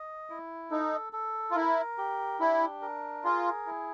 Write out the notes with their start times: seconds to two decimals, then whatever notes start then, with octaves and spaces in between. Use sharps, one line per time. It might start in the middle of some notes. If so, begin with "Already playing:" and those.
Already playing: D#5
0.30 E4
0.71 D#4 A4
1.13 A4
1.51 F4
1.55 E4 A#4
1.98 G4
2.40 D4 E4
2.82 A#4
3.24 F4 G#4
3.66 E4